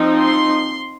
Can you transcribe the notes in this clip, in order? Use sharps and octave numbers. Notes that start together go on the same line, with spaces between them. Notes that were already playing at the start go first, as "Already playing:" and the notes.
Already playing: F3 C4 D#4
C6